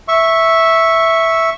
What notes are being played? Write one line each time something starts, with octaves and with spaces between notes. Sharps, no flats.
E5 C#6